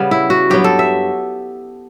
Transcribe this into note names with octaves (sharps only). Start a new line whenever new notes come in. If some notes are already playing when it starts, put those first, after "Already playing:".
Already playing: C#3 G3 B3
E4
F#4
G2 F#3 B3 G4
A4
E5